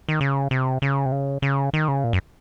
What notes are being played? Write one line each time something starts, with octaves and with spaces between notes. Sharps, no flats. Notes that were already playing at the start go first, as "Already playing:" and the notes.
D#3
C#3
C3
C#3
C3
C#3
C#3
D#3
C#3
A#2
F#2